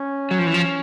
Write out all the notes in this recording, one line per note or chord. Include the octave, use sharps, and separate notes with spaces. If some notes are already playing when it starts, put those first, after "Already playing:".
Already playing: C#4
F#3
F3
E3
F3